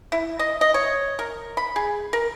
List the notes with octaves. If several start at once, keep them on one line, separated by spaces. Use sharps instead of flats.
E4
D#5
D#5
C#5
A#4
B5
G#4
A#4